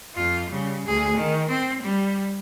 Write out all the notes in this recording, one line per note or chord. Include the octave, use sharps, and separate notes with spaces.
F2 F4
C#3 G3
D2 G#4
D#3
C4
G3